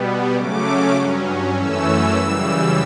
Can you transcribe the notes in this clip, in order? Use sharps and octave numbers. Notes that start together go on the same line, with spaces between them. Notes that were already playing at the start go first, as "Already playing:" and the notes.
Already playing: B2 G3 B3
C#3 F#3 A3 C#4 D6
G2 F#3 C#4
F#2 E3 A3 C#4 E6
F#2 C#3 E3 G3